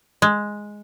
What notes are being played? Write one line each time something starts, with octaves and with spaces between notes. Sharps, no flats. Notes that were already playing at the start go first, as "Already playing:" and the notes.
G#3